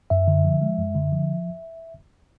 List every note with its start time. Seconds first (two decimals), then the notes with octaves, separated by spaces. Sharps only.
0.10 F#2 E5
0.28 D3
0.45 F3
0.62 G#3
0.78 F#2
0.95 D3
1.12 F3